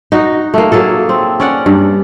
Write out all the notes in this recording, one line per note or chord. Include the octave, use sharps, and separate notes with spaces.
D#4 F#4
A3 A#3
F#3 A#3 G#4 A4
C4
C#4 D5 F#5
G2